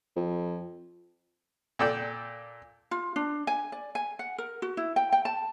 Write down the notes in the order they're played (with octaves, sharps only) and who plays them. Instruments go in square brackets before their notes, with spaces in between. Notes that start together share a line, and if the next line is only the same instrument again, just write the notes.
[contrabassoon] F2
[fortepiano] A#2 A4 D5 G5
[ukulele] F4
D4
G#5
D5
G#5
F#5
A#4
F#4
E4
G5
G5
A5